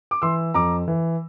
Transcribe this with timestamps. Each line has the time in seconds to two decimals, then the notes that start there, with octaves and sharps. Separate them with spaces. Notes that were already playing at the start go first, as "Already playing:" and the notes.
0.11 D6
0.22 E3 C6 E6
0.54 F2 A#5 D6
0.88 E3